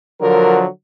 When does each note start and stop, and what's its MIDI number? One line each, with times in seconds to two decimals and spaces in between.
0.21 0.65 50
0.21 0.65 53
0.21 0.65 54
0.21 0.59 70